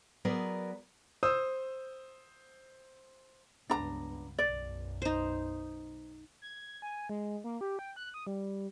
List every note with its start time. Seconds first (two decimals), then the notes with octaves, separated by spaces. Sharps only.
0.25 F#3 B3 G#4 A#4 B4 D5
1.23 C5 D#6 E6
3.70 C#2 G2 B3 D4 A#5
4.38 B1 F#2 D5
5.02 D#4 C5
6.42 G#6
6.82 G#5
7.09 G#3
7.44 A#3
7.61 G4
7.79 G5
7.96 F#6
8.14 D#6
8.27 G3